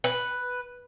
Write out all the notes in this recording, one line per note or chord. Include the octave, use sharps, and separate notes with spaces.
B4